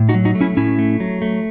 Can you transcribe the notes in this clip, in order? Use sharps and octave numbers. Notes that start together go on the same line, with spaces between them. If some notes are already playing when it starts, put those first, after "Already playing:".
Already playing: A2
D#4 F#4
F#3
D#4 F#4
A3
C#4 E4
A2 C#4 E4
A3
F#3
A3